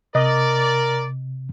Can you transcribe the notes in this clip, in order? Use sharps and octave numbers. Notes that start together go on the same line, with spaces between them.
C3 A#4 D5 D#5